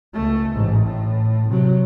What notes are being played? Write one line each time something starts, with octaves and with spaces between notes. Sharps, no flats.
C#2 A3
A1 G#2
A2
C3 F#3